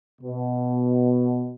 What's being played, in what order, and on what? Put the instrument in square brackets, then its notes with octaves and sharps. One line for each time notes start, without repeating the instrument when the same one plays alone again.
[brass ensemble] B2